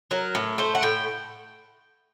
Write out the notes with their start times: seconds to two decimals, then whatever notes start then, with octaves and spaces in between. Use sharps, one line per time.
0.11 F#3 A#4
0.35 A2
0.58 A3 C5
0.75 F#5
0.82 A2 G5